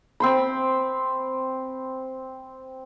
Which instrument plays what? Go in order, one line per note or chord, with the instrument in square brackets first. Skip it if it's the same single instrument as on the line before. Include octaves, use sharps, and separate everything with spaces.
[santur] C4 C5 B5